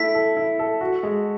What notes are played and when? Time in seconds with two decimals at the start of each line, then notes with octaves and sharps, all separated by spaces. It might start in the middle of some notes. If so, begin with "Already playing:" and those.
Already playing: A3 E4 B6
0.15 A4
0.37 E4
0.59 A4
0.81 F#4
1.03 G#3